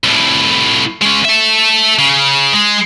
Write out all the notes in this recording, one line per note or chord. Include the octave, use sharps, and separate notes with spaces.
C2 A2
G#3 C#4
A4 E5
C#3
G#3